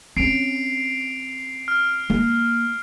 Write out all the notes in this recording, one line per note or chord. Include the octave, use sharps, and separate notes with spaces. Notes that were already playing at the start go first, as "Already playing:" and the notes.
C4 C#4 C7 D7 F7
F6
A#3